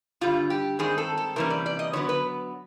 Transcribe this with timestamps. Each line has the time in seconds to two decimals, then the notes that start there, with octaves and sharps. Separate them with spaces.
0.21 G2 D3 G3 F4
0.50 G4
0.79 G2 D#3 G#3 C4 G#4
0.98 A4
1.17 A4
1.36 C3 E3 G3 A#3 C#4 A#4
1.50 D5
1.66 D5
1.79 D#5
1.93 D3 F#3 B3 C#5
2.09 B4